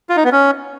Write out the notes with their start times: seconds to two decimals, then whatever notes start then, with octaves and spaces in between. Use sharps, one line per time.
0.09 F4
0.17 D#4
0.24 B3
0.32 C#4